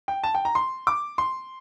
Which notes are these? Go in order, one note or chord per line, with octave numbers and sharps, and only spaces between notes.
G5
A5
G5
A#5
C6
D6
C6